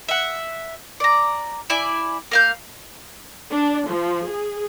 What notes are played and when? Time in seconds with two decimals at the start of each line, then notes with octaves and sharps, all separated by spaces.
0.08 E5 F#5
1.00 D5 A#5
1.70 E4 D5 G#5
2.31 A#3 F5 G6
3.50 D4
3.87 F3
4.25 G#4